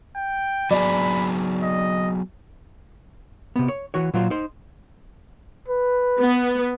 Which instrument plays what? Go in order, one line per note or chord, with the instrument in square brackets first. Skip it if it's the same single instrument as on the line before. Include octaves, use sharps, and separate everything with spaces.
[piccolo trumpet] G5
[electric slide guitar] F#3 B3 G#4 [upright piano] D5 [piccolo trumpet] B5
[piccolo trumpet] D#5
[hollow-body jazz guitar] C3 B3
C#5
E3 F#4 C#5
A#2 F#3 F4 C5
D#4 C5
[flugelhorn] B4
[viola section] B3